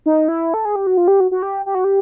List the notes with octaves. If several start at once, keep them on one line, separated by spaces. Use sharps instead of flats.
D#4
E4
A4
G#4
G4
F#4
F4
G4
F#4
F#4
G4
G4
F#4
G4